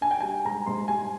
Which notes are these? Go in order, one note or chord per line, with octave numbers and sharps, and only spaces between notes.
D4 G#5
G5
G3 G#5
G#2 A#5
G#2 C6
G3 G#5